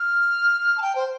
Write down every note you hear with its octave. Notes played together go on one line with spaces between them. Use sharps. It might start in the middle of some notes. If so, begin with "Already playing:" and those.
Already playing: F6
A5
G5
C5